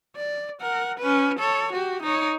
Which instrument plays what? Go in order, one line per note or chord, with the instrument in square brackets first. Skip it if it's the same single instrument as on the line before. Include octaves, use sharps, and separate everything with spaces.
[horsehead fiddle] D5
A#4 F#5
C#4 B4
A4 C#5
F#4 G4
D#4 C#5